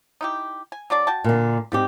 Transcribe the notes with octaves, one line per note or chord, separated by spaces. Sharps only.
D#4 E4 G4
G#5
F#3 D4 D5
F#4 G5 A5
A#2 D3
G#2 G3 C4 G4